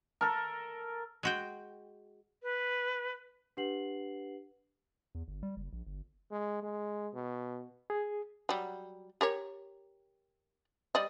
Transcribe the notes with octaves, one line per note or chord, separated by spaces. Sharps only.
A4 A#4
G#3 F#4 G5
B4
D4 G4 B4 F#5 C7 F#7
E2
G1
G3
F#1
A#1
G1
G#3
G#3
B2
G#4
F#3 G3
G4 A#4 C#5
G3 D5 D#5